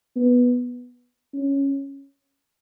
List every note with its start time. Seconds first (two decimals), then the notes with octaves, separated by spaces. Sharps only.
0.16 B3
1.33 C#4